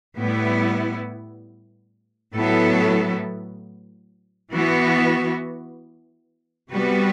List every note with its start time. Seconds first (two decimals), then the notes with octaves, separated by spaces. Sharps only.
0.17 A2 G3 B3 E4
2.34 A2 F#3 B3 E4 A4
4.53 E3 B3 F#4
6.70 C3 G3 B3 F#4 B4